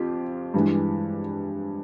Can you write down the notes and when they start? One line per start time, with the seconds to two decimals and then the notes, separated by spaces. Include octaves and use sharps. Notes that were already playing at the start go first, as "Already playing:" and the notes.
Already playing: F2 F4 G4
0.54 G2 E3 G#3